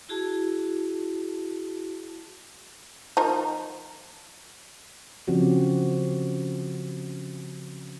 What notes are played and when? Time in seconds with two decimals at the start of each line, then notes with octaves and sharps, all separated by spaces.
0.09 E4 F#4 G#4 A5
3.17 F3 D#4 A#4
5.27 C#3 F3 C4 C#4 F#4 G4